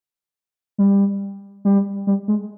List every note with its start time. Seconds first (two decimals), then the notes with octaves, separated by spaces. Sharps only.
0.78 G3
1.65 G3
2.07 G3
2.28 G#3